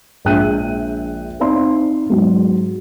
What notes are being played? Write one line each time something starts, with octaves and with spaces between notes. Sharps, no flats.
A#1 G#3 E5 G5 F#6 D#7
C4 D#4 D5 F5 C6
G#2 F#3